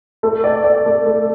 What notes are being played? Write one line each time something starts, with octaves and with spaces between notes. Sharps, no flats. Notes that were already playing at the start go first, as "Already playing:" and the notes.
A3
D5
D5
A3
A3